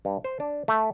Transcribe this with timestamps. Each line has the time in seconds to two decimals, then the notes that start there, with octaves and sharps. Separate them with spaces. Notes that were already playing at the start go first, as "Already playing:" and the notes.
0.05 G2
0.24 C5
0.40 D4
0.68 A3